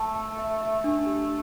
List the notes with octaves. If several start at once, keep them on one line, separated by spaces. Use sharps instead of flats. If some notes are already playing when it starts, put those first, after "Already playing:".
Already playing: A3 E5 A5
A5
E5
E5
D4
G4